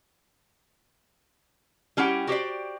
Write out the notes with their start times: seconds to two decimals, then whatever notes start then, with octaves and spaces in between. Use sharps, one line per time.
1.97 G3 C#4 E4 G4 F#5
2.27 F#4 G4 C5 D5